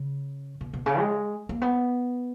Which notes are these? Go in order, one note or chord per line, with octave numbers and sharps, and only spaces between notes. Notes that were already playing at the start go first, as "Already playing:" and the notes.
Already playing: C#3
B2
B2
C#3
G#3
A#3
B3